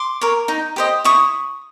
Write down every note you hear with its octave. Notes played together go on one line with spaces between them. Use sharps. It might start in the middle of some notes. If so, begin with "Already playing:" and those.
Already playing: C6 D6
A#4 C#5
D#4
G4 C5 D#5
E4 C#6 D#6